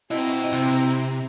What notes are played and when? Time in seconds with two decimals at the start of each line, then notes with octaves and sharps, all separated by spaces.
0.11 C4 E4 F#4 D#5 A#5
0.53 C3